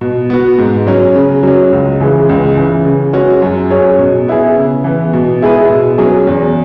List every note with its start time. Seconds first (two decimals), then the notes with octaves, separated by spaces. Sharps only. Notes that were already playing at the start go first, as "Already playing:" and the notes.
0.01 B2
0.30 B3 F#4
0.58 G#2
0.87 F#3 C#4
1.16 C#3
1.43 F#3 C#4
1.72 C#2
2.00 C#3 E3 G#3
2.29 C#2
2.57 C#3 E3
2.85 C#3
3.13 G#3 C#4 F#4
3.42 F#2
3.70 F#3 C#4 G#4 C#5
3.99 B2
4.28 B3 E4 G#4
4.56 C#3
4.84 E3 B3
5.13 B2
5.41 G#3 E4 G#4 B4
5.70 B2
5.98 F#3 C#4 G#4
6.27 E2